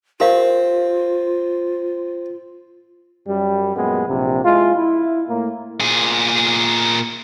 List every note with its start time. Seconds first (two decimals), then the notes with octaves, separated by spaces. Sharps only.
0.20 C4 F4 G4 A#4 F5
3.28 F#2 G3
3.76 F#2 A#2 G#3 B3
4.08 A#1 C3
4.45 G#3 E4 F4
4.76 E4
5.28 A2 A#3
5.80 A#2 G#4